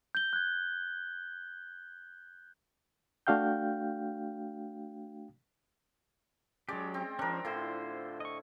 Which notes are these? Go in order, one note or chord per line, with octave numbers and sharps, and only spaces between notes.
G6 G7
F#6 G#6
A3 D4 F#4 F5 G5 G6
F#3 G#3 C#4 G4 D5
C4
F3 C#4 D4 A#4
A2 D3 E4 F4 C5
D#5 C#6